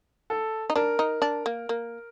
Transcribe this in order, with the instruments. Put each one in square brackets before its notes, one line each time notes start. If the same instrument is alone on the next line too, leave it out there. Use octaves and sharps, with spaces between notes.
[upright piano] A4
[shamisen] D#4
[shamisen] D4 [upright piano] A#4
[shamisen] D#4
D4
A#3
A#3